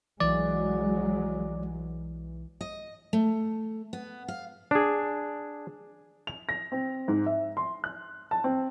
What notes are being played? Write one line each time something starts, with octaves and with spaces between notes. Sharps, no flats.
B1 E3 F#3 G#3 D5
D#5
A3
B3
F5
D4 G#4
F7
A#6
C4
G#2
E5
C6
F#6
A5
C4